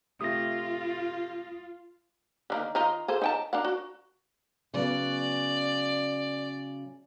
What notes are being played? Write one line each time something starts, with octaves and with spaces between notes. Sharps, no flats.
C3 A3 F4 D#6 A#6
D3 D#3 A#3
D#3 D#4 F4
G#4 A4 C5
D#4 G5 A5
D4 A#4 F#5
F#4
C#3 F#3 B3 D5